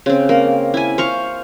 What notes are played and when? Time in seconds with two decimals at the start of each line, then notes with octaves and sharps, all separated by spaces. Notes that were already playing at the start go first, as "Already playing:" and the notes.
0.06 C#3 C4
0.29 A#3
0.74 E4 G#5
0.98 C5 F5 C#6